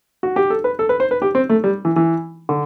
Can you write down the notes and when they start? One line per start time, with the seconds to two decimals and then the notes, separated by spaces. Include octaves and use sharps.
0.23 F#4
0.36 G4
0.50 A4
0.64 B4
0.79 A4
0.89 B4
1.00 C5
1.11 B4
1.22 G4
1.35 C4
1.50 A3
1.64 G3
1.85 E3
1.96 E3
2.49 D3